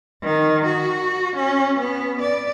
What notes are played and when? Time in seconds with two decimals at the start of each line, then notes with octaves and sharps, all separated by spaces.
0.23 D#3
0.66 F#4
1.36 C#4
1.79 B3
2.21 D5